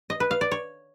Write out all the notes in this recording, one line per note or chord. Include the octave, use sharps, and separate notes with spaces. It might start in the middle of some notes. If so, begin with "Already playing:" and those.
D#5
B4
F5
D5
C#5